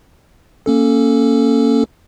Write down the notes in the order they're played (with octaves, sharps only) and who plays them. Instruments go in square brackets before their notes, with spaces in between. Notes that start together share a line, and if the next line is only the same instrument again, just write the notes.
[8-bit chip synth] A#3 C#4 A4